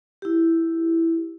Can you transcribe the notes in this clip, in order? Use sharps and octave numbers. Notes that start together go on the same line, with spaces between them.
E4 G4